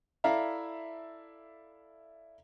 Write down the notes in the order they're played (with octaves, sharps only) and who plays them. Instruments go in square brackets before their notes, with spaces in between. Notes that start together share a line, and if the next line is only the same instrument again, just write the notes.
[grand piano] E4 A4 D5 E5 F5 A#5